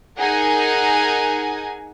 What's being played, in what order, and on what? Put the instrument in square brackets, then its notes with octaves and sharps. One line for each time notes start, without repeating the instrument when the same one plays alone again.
[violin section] D#4 G#4 A#4 F#5 G#5